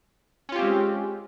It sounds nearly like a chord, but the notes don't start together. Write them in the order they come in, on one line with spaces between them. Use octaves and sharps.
C#4 F4 G4 C4 G#3